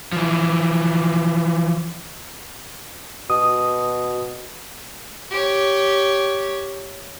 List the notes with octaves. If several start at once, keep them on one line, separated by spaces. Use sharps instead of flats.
E3 F3
B2 F#4 D#6
G4 C#5